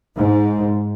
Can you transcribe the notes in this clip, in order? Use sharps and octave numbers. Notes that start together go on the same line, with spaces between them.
G#2